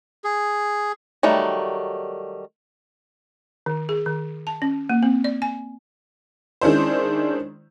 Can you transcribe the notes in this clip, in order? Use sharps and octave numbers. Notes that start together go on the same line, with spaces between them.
G#4
D#3 F#3 G3 A3
D#3
G#4
D#3
A5
C#4
A#3
C4
D5
G#5
D#3 G#3 C#4 D4 E4 C5